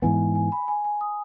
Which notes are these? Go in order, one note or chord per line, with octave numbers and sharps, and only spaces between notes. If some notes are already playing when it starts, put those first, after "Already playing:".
G#2 E3 B3 G#5
G#5
B5
G#5
G#5
D#6